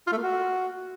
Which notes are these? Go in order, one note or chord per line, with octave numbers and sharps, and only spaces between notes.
F4
A3
A#3
F#4